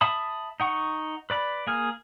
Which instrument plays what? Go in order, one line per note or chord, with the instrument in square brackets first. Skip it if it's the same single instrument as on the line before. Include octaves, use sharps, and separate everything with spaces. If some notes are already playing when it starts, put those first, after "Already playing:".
[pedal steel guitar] E5 A5 B5 D#6
D#4 F#5 C#6
B4 D5 B5
A#3 G#4 F6